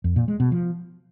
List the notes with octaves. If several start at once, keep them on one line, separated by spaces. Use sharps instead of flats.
F2
A#2
G#3
B2
F3